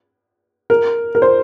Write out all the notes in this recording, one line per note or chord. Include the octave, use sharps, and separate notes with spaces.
A#4
A#4
C5